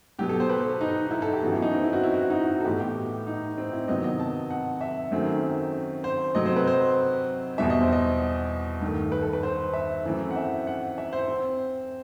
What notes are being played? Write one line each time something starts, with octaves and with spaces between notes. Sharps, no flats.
B2 F#3 B3 G4
A4
C5
B4
A4
D#4
D#4
E4
A4
G4
F#2 E3 B3 F#4
E4
D#4
C4
E4
F#4
E4
F#4
E4
D#4
E4
D#4
F#4
A4
A2 E3 B3 G4
G4
D#4
C4
E4
C3 D#3 F#3 B3 D#5
D#5
A5
F#5
E5
F#2 D#3 F#3 A3 C4
C5
C3 F#3 A3 C4 D#5
C5
B4
C5
E2 B2 G3 E5
D#5
C5
D#5
G2 D#3 A3
B4
A4
B4
C5
E5
F#2 E3 A3 C4
F#5
E5
F#5
E5
C5
C4